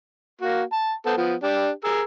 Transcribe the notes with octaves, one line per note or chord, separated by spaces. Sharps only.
A#3 F#4
A5
B3 A4 C5
F3 B3
D4 G4
G#4 A#4 E6